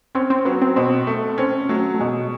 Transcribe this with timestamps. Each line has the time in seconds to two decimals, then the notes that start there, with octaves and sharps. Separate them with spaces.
0.15 C4 C#4
0.30 C4
0.45 F#3 B3
0.62 C4
0.76 B2 C4
1.07 A3
1.38 C4 C#4
1.69 F#3 A3
1.94 A3
2.00 B2 G#3